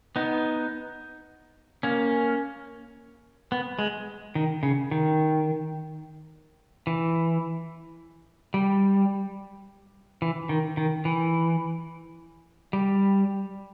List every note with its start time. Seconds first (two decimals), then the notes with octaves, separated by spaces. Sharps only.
0.16 B3 D#4
1.83 A#3 C#4
3.52 B3
3.79 G#3
4.35 D#3
4.63 C#3
4.91 D#3
6.87 E3
8.54 G3
10.22 E3
10.49 D#3
10.77 D#3
11.05 E3
12.73 G3